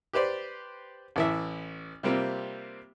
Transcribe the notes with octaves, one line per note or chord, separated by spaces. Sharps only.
G4 B4 C5 D5
A1 E3 E5
C3 G3 A#3 C4 F4